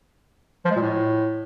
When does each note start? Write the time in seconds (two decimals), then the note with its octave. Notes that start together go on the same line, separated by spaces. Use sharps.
0.65 F3
0.71 G#3
0.76 A#2
0.82 A2